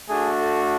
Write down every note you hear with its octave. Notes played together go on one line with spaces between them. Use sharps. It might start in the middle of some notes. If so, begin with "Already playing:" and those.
A3 D4 F#4 G#4
A4